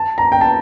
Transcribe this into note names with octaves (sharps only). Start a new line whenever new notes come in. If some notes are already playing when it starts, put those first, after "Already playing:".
Already playing: A5
A#5
G5
A5